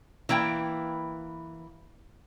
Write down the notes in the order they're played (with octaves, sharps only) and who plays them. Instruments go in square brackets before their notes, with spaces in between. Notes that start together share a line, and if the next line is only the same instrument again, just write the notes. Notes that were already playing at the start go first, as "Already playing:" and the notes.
[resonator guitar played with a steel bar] E3 A#3 E4 G5